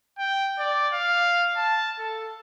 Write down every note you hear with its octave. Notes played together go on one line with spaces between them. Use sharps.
G5
D5
F5
A5
A4